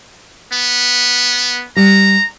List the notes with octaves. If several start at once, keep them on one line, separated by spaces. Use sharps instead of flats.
B3
G3 A#5